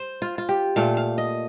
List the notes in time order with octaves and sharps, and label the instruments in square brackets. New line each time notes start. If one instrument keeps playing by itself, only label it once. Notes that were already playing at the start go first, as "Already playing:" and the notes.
Already playing: [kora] C5
F4
F4
G4
A#2 A3 F5
F5
D#5